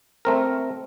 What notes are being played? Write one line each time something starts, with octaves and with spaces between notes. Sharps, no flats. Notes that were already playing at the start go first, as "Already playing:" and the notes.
A3 C4 A#4